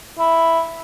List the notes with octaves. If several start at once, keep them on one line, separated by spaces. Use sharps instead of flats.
E4